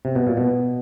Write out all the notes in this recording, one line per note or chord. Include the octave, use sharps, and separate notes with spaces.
C3
B2
A#2
B2